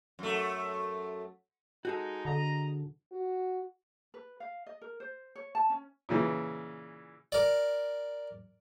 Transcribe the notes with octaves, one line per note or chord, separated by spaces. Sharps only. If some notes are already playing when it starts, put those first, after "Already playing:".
F#2 A3
G#3 D#4 F#4 G#4 A4
D3 D#5 A#5
F#4
B4
F5
D#5
A#4
C5
C#5
A5
C#4
A#2 C#3 E3
A#4 D5